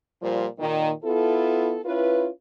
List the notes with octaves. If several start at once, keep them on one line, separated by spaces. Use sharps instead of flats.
A#2 F3 G3 C5
A#2 D#3
B3 E4 F4 A4
C#4 E4 F4 B4